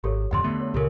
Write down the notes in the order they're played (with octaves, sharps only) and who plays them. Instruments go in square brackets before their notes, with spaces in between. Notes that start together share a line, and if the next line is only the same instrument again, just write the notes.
[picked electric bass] G#1 [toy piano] G4 A4 C#5
[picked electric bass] D1 F2 D3 [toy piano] F#5 C6
[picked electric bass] D3 A3 B3
[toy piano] C#5
[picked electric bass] C#2 A#2 C#3 [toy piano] G4 A4 A#4